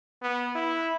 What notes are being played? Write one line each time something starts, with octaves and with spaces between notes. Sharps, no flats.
B3
E4